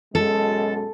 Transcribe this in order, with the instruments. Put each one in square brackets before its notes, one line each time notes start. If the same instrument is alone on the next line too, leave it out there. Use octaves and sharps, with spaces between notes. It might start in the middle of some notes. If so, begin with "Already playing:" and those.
[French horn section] F#2 B2 G#3 [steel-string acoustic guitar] A4